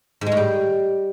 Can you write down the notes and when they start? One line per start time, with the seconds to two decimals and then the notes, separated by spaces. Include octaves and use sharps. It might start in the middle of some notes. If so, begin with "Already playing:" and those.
0.21 G#2
0.26 G#3
0.32 A2
0.37 G3